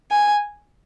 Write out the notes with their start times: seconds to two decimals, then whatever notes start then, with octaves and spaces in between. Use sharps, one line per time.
0.11 G#5